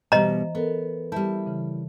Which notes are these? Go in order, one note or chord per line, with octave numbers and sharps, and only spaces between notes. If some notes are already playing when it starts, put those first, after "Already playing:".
B2 E3 G3 C5 D#5 A#5
B3 A4 A#4
G3 E4 A5 G6
C#3 E3